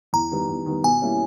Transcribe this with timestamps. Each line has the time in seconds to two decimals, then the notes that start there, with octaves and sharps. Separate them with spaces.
0.13 E2 A#5
0.31 D#3 G3 B3
0.49 E2
0.66 D#3 G3 B3
0.83 B2 G#5
1.02 G3 A#3 C#4 E4